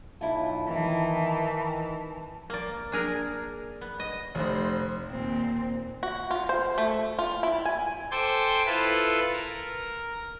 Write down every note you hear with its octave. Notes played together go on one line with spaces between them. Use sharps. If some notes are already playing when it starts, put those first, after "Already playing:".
B1 E4 F4 A5
D#3 E3
A#3 D5
D4 G#4 A#4
B3
D#5
F1 C5
D#2 A#2 C4
F#4
F4
C5
A3
F4
E4
G#5
A4 C5 G5 G#5 C6 D6
E4 F4 A4 B4
A#4